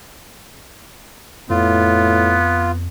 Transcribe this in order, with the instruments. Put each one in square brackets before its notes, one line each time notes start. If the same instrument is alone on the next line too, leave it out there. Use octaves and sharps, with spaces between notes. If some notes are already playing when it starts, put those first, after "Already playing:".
[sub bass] F2 [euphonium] A2 [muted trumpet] B3 [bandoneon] F4